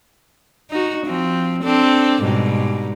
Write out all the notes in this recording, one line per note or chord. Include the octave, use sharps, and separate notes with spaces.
D#4 F#4
F3 C4
C4 D4 A4
G#2 B2 G3